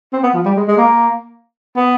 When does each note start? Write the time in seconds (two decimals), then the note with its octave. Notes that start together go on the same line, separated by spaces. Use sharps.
0.13 C4
0.23 B3
0.34 F3
0.45 G3
0.57 G#3
0.68 G#3
0.78 A#3
1.76 B3